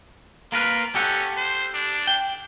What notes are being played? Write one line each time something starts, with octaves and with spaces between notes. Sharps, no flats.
A#3 F4 A#4 B4
C#4 G4 A4 F#5
C5
D4
G5